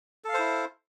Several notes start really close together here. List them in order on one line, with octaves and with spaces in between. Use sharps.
A4 F5 C5 E4